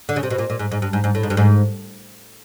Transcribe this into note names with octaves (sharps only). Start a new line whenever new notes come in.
D3
C#3
C3
B2
A#2
A#2
G#2
G#2
G2
G#2
G#2
A2
G#2
G2
G#2